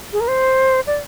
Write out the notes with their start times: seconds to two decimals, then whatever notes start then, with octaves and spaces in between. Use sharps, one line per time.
0.13 G#4
0.20 A#4
0.28 C5
0.87 D5